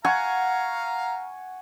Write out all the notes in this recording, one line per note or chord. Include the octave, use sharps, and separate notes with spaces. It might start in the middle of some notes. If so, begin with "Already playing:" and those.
F5 F#5 G#5 A#5 C#6